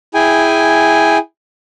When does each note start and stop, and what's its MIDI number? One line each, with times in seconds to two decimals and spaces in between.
0.14 1.18 64
0.14 1.18 68
0.14 1.18 79
0.14 1.18 80